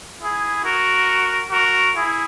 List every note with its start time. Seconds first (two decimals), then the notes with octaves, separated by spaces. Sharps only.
0.21 E4 G#4
0.64 F#4 A#4
1.51 F#4 A#4
1.94 E4 G#4